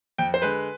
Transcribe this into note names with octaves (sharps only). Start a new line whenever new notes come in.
F2 G5
C5
D3 G#3 B4